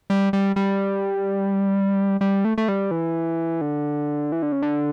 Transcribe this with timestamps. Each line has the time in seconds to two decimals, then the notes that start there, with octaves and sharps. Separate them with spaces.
0.10 G3
0.33 G3
0.56 G3
2.21 G3
2.45 A3
2.58 A3
2.68 G3
2.91 E3
3.61 D3
4.32 E3
4.42 D3
4.52 C#3
4.62 D3